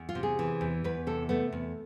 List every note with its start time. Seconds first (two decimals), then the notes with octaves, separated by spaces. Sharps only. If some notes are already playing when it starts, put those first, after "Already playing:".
Already playing: E2
0.09 F4
0.15 C3
0.23 G#4
0.39 E3
0.61 E2
0.84 E2 B4
1.07 C3 A4
1.29 A3 B3
1.52 E2